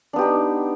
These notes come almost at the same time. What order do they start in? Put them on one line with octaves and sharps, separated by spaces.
D4 B3 G4 D#4